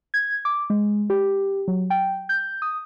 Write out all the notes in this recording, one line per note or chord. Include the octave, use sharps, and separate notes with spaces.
G#6
D6
G#3
G4
F#3
G5
G6
D#6